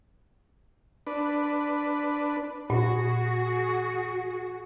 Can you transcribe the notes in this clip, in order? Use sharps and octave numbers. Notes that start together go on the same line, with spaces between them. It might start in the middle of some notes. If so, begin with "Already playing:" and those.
D4 B4
A#2 F#4 G#4